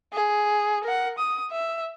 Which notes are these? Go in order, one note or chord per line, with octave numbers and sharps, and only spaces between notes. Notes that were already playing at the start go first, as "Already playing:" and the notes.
G#4
A#4 F#5
D#6
E5